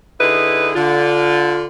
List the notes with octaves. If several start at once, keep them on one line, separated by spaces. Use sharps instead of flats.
D3 D#4 E4 G#4 B4
D3 F4